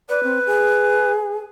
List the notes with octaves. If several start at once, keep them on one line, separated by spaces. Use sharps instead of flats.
B4 D5
C4
G#4